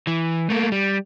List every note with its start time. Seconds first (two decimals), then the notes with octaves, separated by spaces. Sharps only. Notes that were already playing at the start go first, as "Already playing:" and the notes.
0.07 E3
0.50 A3 A#3
0.72 G3